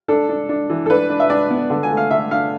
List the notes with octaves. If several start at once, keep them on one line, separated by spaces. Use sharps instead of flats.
D4 A4
D4
D4
E3
A4
D4 B4
D4
E5
D4 D5
B3
D3
G#5
A3
F5
D3 E5
D4 F5